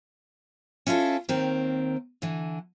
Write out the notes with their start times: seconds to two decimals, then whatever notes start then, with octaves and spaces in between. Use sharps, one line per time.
0.87 C#4 E4 F4 G#4 A4
1.29 D#2 D#3 C4 A#4
2.22 D3 E3